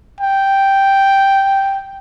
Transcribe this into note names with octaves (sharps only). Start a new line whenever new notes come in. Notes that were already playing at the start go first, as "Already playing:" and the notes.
G5